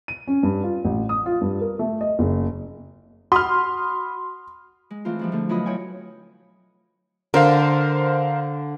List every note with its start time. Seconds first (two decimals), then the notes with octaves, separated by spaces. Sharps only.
0.08 D#7
0.28 C#4
0.43 G2
0.64 F4
0.85 A1
1.09 D#6
1.26 F4
1.41 G2
1.61 A#4
1.79 A3
2.01 D#5
2.19 F#1
3.32 F#4 B5 C6 D#6 F6
4.90 G#3
5.05 E3 A3 C4 F4
5.19 G#2 F3 G3
5.32 D3 A3
5.49 B2 F#3 E4 F4 D#5 B5
5.66 C4 E4 C#5 G5 G#5
7.34 D3 A#4 C5 F5